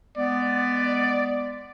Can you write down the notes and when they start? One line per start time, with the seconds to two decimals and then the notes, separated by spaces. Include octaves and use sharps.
0.18 G#3 B3 D5